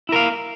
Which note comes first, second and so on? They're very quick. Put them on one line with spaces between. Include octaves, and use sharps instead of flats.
E4 A#4 F5